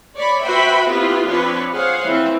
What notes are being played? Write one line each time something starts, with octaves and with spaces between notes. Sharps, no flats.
C#5 D5 B5
F#4 B4 C5 E5 G5 B5
B3 C4 E4 F4 G4 B4
F3 C4 D4 B4 C#5
G#4 C5 C#5 F5 F#5
E3 C4